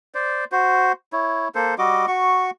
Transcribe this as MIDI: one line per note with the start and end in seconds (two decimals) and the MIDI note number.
0.14 0.45 72
0.14 0.45 74
0.52 0.92 66
0.52 0.92 72
1.13 1.48 64
1.13 1.48 73
1.55 1.75 58
1.55 1.75 69
1.55 1.75 72
1.78 2.06 55
1.78 2.06 66
1.78 2.06 75
1.78 2.06 86
2.08 2.51 66
2.08 2.51 85